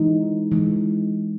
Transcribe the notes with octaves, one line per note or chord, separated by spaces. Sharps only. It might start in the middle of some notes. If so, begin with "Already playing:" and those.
Already playing: E3 G#3 D#4
E3 G#3 D#4